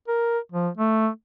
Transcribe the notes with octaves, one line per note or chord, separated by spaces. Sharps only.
A#4
F3
A3